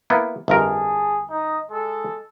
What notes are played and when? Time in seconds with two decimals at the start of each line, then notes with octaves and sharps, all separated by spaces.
0.10 A#3 B3 E4
0.48 G1 F2 G#4 A#4 A5
1.29 D#4 D#5
1.70 G#3 A4